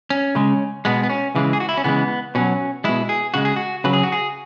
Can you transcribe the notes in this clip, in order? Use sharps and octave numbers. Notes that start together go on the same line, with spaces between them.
C#4
C#3 G#3
B2 G#3 B3
B3
C#4
C#3 E3 G#3
G#4
F#4
E4
C#4
C#3 E3 G#3 B3
B2 F#3 C#4
B2 G#3 E4
G#4
C#3 G#3 F#4
G#4
F#4
C#3 F#3 B4
G#4
F#4
G#4